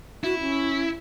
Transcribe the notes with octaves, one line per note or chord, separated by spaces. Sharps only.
E4 F#4
C#4